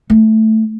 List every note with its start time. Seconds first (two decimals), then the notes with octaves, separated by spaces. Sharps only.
0.10 A3